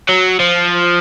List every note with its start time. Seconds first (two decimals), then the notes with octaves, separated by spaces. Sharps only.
0.09 F#3
0.40 F3